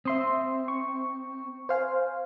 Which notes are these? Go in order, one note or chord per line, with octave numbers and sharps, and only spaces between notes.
C4 E5 C6 D#6
C#6
C5 F5 G#5